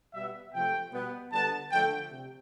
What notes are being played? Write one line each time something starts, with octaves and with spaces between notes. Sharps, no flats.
B2 G3 B3 E5
C3 F3 A3 G5
B2 G3 B3
D3 G3 B3 A5
D3 F3 A3 G5
C3